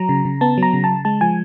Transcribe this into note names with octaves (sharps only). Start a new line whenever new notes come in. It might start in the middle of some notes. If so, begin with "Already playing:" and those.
Already playing: F#3 A#5
C#3
C#3
B3 A5
F#3
A#5
C#3
A5
C#3
G#3 A5
F3 G#5